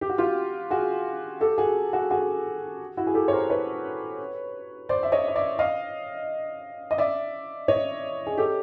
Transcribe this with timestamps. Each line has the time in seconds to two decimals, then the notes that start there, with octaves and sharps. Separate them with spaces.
0.01 G4
0.09 F#4
0.18 F4 G4
0.70 F#4 G#4
1.40 G4 A4
1.58 F#4 G#4
1.93 F#4 G#4
2.11 F#4 G#4
2.97 E4 F#4
3.07 G#4
3.14 G4 A4
3.28 C#5
3.32 A#4 C5
3.50 B4 C#5
4.89 C5 D5
5.03 E5
5.12 C#5 D#5
5.28 D#5
5.36 D5 E5
5.59 D#5 F5
6.91 D#5
6.98 D5 E5
7.68 C#5 D#5
8.27 G#4
8.37 G4 A4